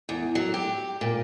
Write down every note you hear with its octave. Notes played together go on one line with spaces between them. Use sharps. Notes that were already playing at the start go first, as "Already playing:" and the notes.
E2
F#3
G4
A#2